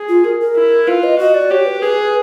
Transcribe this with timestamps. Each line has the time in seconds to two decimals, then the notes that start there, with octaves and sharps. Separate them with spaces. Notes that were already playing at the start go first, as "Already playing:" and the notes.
Already playing: G#4
0.09 F4
0.25 A#4
0.40 A#4
0.56 E4
0.87 F4 B4
1.03 D#5
1.19 F#4 D#5
1.34 D5
1.50 G4 C#5
1.66 B4
1.82 G#4 B4